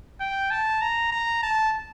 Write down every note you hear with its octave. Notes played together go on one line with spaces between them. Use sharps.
G5
A5
A#5
A#5
A5